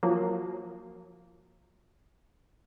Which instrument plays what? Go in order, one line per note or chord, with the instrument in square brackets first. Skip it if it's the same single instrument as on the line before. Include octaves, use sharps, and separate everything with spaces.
[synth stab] F3 F#3 A#3